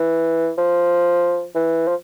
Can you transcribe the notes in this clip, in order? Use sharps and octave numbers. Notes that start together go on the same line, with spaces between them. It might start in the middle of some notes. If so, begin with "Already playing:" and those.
Already playing: E3
F3
E3
F3